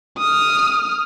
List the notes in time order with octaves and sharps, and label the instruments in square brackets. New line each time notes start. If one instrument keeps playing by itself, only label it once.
[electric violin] D#6 F6